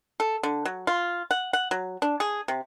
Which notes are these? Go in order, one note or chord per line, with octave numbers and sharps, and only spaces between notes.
A4
D3
F#3
F4
F#5
F#5
F#3
D4
G#4
C3